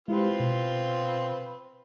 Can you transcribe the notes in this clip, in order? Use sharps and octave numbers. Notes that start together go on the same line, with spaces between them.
G#3 C4 E4 F4 G4 B4
B2